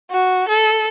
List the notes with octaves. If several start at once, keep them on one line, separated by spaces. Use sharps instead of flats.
F#4
A4